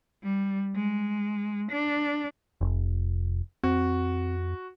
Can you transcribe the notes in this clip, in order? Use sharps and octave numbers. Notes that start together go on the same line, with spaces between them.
G3
G#3
D4
F1
F2 C4 F#4